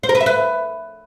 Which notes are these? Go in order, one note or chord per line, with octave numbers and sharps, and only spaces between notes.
C5
A#4
B4
E5
B4